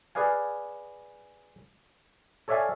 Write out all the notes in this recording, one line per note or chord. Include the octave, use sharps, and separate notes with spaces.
G#4 B4 D5 F5 G#5
A4 C#5 D5 E5 F5 G#5